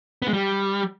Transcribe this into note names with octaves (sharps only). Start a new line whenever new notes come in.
B3
G#3
G3